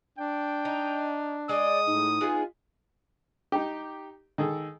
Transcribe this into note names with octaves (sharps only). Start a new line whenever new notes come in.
D4 G5
D#4
G#3 D5 D#5 D#6
A2 D#4
G#3 B3 F4 G#4
D#4 G4
D#3 G#4 A4